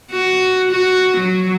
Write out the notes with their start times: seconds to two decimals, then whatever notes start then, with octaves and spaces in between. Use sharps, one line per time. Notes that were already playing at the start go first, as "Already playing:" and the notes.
0.11 F#4
0.72 F#4
1.18 F#3